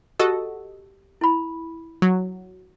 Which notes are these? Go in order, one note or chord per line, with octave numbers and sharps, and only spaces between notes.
F#4 G4 A4 D#5 E6
E4 B5
F#3